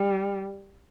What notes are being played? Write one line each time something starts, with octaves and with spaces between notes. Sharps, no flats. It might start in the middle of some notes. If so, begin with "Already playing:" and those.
Already playing: G3